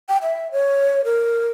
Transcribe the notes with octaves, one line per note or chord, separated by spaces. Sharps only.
G5
E5
C#5
A#4